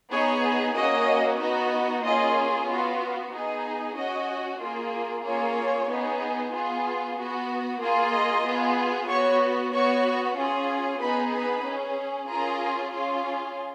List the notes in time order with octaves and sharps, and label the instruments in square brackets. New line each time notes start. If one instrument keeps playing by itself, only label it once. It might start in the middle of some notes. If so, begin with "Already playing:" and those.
[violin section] B3 D#4 G#4 C#5
A#3 C#4 F#4 D#5
B3 D#4 F#4
A#3 C#4 F4 G#4 D#5
B3 F4 F#4 F5
B3 D#4 G#4
C#4 F#4 D#5
A#3 F4 G#4
A#3 C#4 F4 G#4 C#5
B3 D#4 G#4
B3 F4 G#4
B3 F#4
A#3 F4 G#4
D#5
B3 F4 G#4
B3 F#4 C#5 C#6
B3 F#4 C#5 C#6
C#4 F4 G#4
B3 D#4 G#4 B4 B5
B4 B5
C#4 G#4
C#4 F4 G#4 A#4 A#5
C#4 F4 G#4